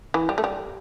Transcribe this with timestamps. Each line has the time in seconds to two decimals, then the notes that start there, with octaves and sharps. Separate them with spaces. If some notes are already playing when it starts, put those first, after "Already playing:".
0.14 E3
0.29 G3
0.38 A3
0.44 G3